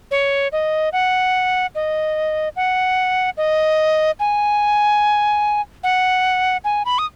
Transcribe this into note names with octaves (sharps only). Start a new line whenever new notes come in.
C#5
D#5
F#5
D#5
F#5
D#5
G#5
F#5
G#5
B5
D#6